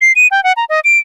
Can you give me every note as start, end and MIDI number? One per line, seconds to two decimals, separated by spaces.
0.01 0.12 96
0.16 0.27 99
0.31 0.43 79
0.44 0.52 78
0.57 0.65 82
0.69 0.80 75
0.84 0.98 98